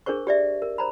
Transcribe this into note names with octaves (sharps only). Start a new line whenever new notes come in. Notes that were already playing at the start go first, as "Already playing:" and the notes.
D4 G#4 A#4 C5 C#6
G4 D5 E5
A#4
C5 A#5 B5